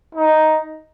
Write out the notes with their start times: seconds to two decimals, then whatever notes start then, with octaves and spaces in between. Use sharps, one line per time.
0.15 D#4